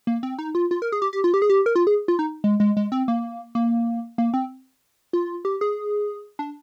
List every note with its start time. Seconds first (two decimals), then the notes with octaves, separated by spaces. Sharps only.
0.07 A#3
0.23 C4
0.39 D#4
0.55 F4
0.71 F4
0.82 A#4
0.92 G#4
1.02 G4
1.13 G4
1.24 F4
1.34 G4
1.42 G#4
1.50 G4
1.66 A#4
1.76 F4
1.87 G#4
2.08 F4
2.19 D#4
2.44 G#3
2.60 G#3
2.77 G#3
2.92 C4
3.08 A#3
3.55 A#3
4.18 A#3
4.34 C4
5.13 F4
5.45 G4
5.61 G#4
6.39 D4